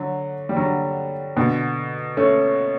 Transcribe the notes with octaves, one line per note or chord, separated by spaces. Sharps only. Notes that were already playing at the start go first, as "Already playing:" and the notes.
Already playing: D3 F#3
G3
D3 F#3
B2 D3
A3 C#4